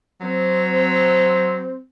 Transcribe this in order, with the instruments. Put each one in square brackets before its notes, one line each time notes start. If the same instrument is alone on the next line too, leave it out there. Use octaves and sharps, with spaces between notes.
[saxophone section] F#3 C4